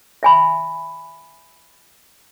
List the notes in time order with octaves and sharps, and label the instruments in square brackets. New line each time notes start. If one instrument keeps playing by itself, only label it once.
[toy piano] E5 G#5 B5